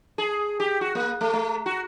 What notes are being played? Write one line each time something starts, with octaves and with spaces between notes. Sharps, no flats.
G#4
G4
F#4
A#3
A3
A3
F#4